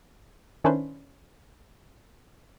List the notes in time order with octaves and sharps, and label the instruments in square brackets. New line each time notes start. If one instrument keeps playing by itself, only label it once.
[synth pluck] D#3 C#4 D4 E4 B4 C5